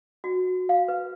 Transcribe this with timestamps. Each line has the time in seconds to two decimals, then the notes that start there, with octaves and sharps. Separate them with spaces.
0.24 F#4
0.69 F5
0.88 B4